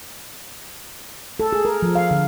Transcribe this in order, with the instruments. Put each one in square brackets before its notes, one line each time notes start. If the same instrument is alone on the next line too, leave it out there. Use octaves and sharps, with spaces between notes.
[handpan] A4
G#4
A#4
F3
F5
D3